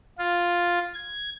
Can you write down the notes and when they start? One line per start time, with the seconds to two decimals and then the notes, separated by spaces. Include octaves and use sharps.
0.18 F4
0.94 G#6